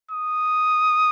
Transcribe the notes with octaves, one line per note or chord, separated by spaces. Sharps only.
D#6